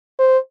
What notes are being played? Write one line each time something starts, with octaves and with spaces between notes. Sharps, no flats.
C5